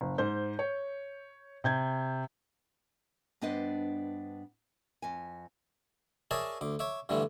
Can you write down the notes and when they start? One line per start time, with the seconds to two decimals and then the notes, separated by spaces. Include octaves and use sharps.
0.01 F#1
0.18 G#2 C5 G6
0.59 C#5
1.64 C3 G6 G#6
3.41 G2 B3 D4 C5 D#5
5.02 F2 G#5
6.31 G#4 A#4 C#5 D5 E5 A5
6.61 D2 D6
6.79 C#5 E5 D6
7.09 G2 D3 E3 G3 A3